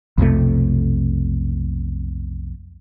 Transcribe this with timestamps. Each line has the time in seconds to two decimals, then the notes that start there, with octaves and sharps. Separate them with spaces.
0.18 B1 F2 C3 A3